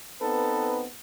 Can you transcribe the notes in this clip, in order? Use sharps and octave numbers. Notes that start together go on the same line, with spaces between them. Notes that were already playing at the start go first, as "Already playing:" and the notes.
B3 C4 D#4 A4 B4